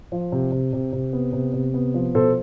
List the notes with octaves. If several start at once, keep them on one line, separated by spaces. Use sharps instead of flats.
F3
C3
C3
C3
C3
B3
C3
C3
B3
F3
B2 A4 C5